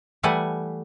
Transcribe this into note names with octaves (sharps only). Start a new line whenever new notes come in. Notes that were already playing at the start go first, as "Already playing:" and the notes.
E3 G3 A3 F#5 G#5